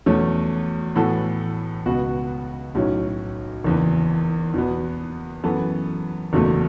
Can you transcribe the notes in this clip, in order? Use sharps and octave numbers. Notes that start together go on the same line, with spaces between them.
E2 B2 F#3 A3 C#4
A2 E3 B3 F#4 A4
C#2 B2 B3 F#4
B1 A2 F#3 C#4
F#1 E2 E3
E2 B2 B3
F#2 E3 B3 A4
F#1 E2 B2 A3